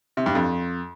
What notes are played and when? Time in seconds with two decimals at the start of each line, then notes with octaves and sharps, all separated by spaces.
0.17 C3
0.26 G2
0.35 F2